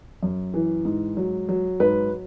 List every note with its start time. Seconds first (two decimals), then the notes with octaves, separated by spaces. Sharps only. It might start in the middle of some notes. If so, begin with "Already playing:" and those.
0.23 F#2
0.54 E3
0.85 G#2
1.17 F#3
1.49 F#3
1.80 G#2 B4